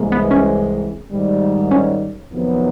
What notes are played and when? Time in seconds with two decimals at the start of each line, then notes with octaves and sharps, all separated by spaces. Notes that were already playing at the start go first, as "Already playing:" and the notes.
Already playing: C2 C3 E3 G#3 A#3
0.12 B3
0.31 C#4
1.11 G#2 D#3 G3
1.71 C#4
2.31 F2 C3 D#3 F#3 B3